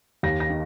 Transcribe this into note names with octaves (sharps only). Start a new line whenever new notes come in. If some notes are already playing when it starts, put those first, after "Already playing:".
D#2 A#6
A#6
D#3